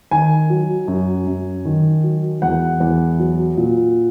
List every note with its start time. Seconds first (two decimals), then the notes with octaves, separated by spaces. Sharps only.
0.11 D#3 G#5
0.50 F#3
0.88 F#2
1.27 F#2
1.65 D#3
2.03 F#3
2.42 E2 F#5
2.80 E2
3.19 F#3
3.57 A#2